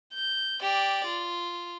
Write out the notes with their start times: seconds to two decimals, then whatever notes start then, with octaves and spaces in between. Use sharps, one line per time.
0.14 G6
0.62 G4 D5
1.07 F4